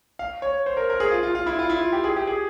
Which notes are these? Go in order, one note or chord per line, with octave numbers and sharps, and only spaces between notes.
F5
C#5
C5
A#4
A#4
G#4
F4
F4
F4
E4
F4
E4
F4
G4
G#4
G4
G#4